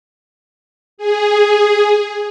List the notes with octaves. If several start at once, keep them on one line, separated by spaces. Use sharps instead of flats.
G#4